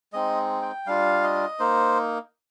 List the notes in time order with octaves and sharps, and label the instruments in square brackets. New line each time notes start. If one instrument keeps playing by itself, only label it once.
[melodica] G#3 C4 D#4 D#5
G5
G3 D4 F4 F5
D#5
A#3 D#4 C5